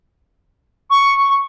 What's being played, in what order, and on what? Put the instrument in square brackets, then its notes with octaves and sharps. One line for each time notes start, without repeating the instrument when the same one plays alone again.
[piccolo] C#6